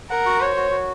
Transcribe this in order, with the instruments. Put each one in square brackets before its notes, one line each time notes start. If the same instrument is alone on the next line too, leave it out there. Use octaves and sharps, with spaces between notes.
[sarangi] A#4 [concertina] F#5
[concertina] F#4
[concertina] C5 [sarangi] C#5
[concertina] F#4
F#4